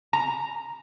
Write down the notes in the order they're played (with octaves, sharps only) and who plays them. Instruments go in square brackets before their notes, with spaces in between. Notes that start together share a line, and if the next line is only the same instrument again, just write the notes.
[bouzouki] A#5